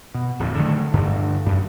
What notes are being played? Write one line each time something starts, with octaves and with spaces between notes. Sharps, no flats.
B2
D1 F2 A#2
D3 D#3 F#3 A3
D2 G2 D3
F#2